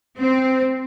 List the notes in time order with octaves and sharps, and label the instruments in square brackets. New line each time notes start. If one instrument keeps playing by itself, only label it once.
[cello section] C4